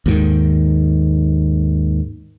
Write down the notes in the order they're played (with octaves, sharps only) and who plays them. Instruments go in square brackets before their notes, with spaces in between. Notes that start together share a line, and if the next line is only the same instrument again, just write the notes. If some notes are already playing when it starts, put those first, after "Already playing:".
[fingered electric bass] D#2 G#2 D#3